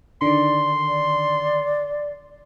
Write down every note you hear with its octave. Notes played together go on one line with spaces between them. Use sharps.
D3 D#3 D5 C6
D5